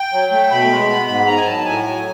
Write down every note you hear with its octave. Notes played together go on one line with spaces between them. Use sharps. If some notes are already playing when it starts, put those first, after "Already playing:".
Already playing: G5
F#3
A3
B2 B5
G#3
B3
G#2 B5
D#3 A#5
G#5
F#3 A5
A2 G#5
F#3